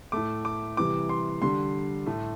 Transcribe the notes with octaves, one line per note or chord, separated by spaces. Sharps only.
A2 A3 D6
D6
C3 E3 G3 D6
C6
D3 G3 C6
A2 A3